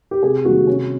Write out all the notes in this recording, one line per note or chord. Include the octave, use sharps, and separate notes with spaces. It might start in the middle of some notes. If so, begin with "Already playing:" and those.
G4
C3 G#4
D#3 G3 A#3 F#4
C3 C#4